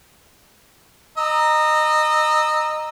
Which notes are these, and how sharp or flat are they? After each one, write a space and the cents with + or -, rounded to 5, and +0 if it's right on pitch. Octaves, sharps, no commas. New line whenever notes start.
D#5 -20 A#5 +0 E6 -20